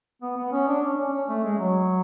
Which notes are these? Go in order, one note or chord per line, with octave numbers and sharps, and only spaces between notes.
B3
B3
C#4
D4
C#4
C#4
C#4
A3
G#3
F#3